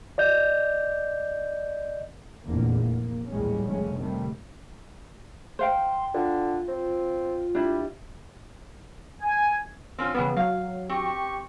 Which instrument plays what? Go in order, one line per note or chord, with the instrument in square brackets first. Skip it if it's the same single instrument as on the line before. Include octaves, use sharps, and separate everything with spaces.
[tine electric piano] D5 D#5 G6
[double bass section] F1 A#1 E2 A#2 D3 A#3
A#3
A1 D#2 G3 G#3 C#4
F1 C#3 G#3 A3 C#4
C3 D#3 G3 A3
[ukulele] C5 F5 G5 [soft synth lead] C6
[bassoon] D3 [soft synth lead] F4
[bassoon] C4
[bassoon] G3 [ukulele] D4 E4
[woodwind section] G#5
[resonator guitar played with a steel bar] C4 C#4 F4
[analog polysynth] C#3 B3 [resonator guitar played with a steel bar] E3 G3
[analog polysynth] F#3 [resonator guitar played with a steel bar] F5
[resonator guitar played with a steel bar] C4 [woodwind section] G4 C#6